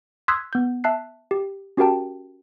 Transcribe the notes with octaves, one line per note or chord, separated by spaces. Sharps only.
C6 D#6 E6 F#6 G#6 B6
B3 G6
E5 A5 F#6 C7
G4
C#4 F#4 G4 A#4 G5 A5